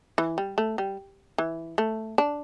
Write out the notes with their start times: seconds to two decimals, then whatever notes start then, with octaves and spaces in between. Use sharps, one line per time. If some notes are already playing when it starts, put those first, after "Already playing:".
0.18 E3
0.38 G3
0.58 A3
0.78 G3
1.38 E3
1.78 A3
2.18 D4